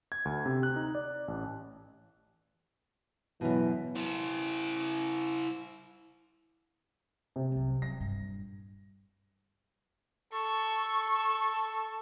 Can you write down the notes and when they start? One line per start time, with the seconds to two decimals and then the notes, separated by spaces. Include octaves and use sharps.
0.12 G#6
0.25 D2
0.46 C3
0.63 F#6
0.76 D#4
0.95 D5
1.28 A1
3.41 F#2 B2 E3
3.96 E4 C5
7.36 C3
7.52 C2 F#3
7.82 F#3 A#6
8.01 G2 A#2
10.33 A4 C#6